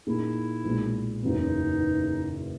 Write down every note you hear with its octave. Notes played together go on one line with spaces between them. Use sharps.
A#2 A#3 D#4 E4 G#4
B1 A#2 G#3
F#1 E2 C#3 F#3 B3 D#4